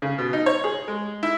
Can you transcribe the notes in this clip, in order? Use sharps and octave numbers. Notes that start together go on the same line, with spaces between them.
C#3
B2
D#4
C#5
G#4
G#3
E4